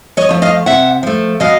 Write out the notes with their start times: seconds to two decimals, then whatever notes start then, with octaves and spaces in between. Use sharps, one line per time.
0.17 C#5 D#5
0.29 F3 A3
0.42 D#5 F5
0.66 C3 E5 F#5
1.03 F3 A3
1.40 B2 D#5 F5